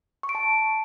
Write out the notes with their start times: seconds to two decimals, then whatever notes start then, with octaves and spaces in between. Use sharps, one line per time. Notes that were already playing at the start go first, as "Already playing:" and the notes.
0.23 C#6
0.29 D7
0.35 A5